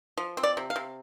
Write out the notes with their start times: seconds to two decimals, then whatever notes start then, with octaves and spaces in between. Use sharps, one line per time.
0.17 F3
0.37 C4
0.43 D5
0.57 C3
0.70 F5
0.76 C3